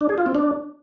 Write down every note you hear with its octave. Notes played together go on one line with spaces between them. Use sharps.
D4
G#4
F4
C4
D4